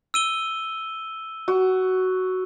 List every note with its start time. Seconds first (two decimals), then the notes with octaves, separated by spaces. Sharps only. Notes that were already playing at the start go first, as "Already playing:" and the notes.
0.14 E6 D#7 G7
1.48 F#4